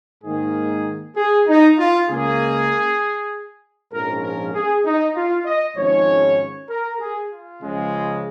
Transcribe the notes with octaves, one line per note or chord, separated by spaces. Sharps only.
G#2 D#3 A#3 G#4
G#4
D#4
F4
C#2 C#3 A#3 G#4
A#1 G#2 F3 C#4 A#4
A#4
G#4
D#4
F4
D#5
G#1 G#2 F3 C#4 C#5
A#4
G#4
F4
C#2 C#3 F3 G#3